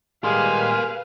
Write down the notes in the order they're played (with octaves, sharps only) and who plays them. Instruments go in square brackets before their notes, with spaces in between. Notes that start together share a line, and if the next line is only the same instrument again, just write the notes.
[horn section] D#3 G3 G#3 [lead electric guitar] A#4 C6 [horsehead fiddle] B4 F5 [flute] G#5